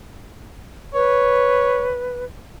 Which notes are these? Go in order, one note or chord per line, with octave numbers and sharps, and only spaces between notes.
B4 C#5